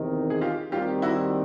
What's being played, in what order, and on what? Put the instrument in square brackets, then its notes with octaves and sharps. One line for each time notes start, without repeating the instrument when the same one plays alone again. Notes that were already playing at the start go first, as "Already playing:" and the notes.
Already playing: [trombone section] E2 C3 D#3
[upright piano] G#4
F4 G4
[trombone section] D#2 D#3 G3 C4 [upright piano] F4 G4
[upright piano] E4 F#4